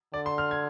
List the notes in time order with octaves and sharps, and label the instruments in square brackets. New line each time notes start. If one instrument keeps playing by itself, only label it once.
[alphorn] D3 [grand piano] D5
[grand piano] C6
F6
G#6